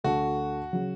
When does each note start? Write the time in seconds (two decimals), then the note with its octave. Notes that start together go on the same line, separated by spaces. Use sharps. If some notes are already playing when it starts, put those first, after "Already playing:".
0.04 D2 D3 A3 F#4
0.72 C#3 F#3